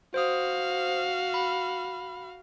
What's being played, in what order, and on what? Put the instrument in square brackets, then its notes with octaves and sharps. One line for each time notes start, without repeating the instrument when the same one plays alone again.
[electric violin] F#4 F5 [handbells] C5 D#6
[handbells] B5